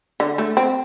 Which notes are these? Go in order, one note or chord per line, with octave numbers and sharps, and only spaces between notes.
D3
A3
C4